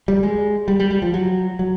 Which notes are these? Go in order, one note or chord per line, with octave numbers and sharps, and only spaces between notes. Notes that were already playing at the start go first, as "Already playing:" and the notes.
G3
G#3
G3
G3
G3
F3
F#3
F#3